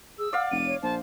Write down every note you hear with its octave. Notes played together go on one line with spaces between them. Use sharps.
G#4 E6
D5 F5 F#5
F1 D#7
C#5
A#1 C5 A5